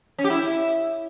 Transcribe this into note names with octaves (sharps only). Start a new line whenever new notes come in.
C#4
G4
E4